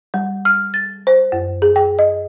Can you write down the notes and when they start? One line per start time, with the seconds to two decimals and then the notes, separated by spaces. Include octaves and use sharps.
0.14 G3
0.45 F6
0.74 A6
1.07 C5
1.32 F#2
1.62 G#4
1.76 G5
1.99 D#5